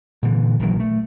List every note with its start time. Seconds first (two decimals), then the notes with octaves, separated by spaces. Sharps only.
0.23 A#2 D3 E3
0.60 A#1 D#3 E3 F#3
0.80 A3